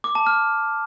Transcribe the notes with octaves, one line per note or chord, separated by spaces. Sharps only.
D6
A5
F6